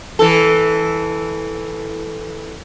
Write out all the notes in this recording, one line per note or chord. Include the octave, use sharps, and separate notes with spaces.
E3 A4